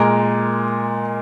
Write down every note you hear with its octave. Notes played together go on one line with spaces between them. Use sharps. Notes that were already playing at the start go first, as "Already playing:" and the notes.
Already playing: A#2 G#3 A#4